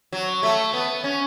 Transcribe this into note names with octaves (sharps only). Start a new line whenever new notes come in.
F#3
A3
B3
C#4